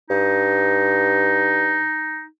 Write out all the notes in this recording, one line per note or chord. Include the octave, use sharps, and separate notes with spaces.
G2 D#4